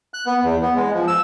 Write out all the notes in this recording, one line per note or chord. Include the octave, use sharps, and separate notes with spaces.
F#6
B3
E2
B3
G#3
F3
E6